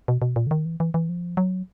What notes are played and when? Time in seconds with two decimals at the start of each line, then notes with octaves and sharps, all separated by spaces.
0.08 B2
0.22 B2
0.36 A#2
0.47 D3
0.51 D#3
0.65 E3
0.80 E3
0.94 E3
1.09 F3
1.37 F#3